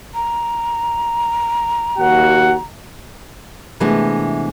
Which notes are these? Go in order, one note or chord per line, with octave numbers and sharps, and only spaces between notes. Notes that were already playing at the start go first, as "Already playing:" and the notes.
A#5
D#2 F#4 F#5
C3 E3 G#3 A3 B3 D4